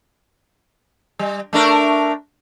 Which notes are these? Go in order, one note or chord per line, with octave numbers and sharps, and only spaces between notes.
G3
A3 D4 A#4